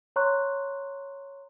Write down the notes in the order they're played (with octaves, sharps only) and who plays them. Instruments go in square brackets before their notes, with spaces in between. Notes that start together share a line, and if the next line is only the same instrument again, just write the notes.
[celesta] C#5 A#5 C6 C#6 F#6